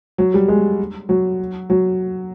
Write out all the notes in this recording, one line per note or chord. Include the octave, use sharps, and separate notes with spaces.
F#3
G3
G#3
F#3
F#3